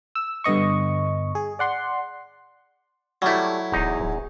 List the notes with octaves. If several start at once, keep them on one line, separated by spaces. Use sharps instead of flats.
E6
G2 D3 B3 D#5 C#6
G#4
D5 F#5 C6
F#3 G3 A3 E4
D1 E2 D#4
D1